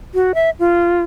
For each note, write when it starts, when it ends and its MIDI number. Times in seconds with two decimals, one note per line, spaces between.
0.14 0.32 66
0.35 0.50 76
0.59 1.02 65